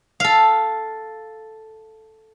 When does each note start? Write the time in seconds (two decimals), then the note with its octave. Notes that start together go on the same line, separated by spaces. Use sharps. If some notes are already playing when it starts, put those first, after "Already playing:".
0.20 A4 F5